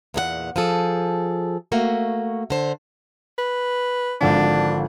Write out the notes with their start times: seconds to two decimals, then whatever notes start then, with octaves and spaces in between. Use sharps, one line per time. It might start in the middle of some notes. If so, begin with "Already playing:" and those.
0.14 E2 A#2 G#4 F#5
0.56 F3 G#4 A4
1.72 A3 A#3 F#4
2.50 D3 C5
3.39 B4
4.21 G#1 D3 F3 D4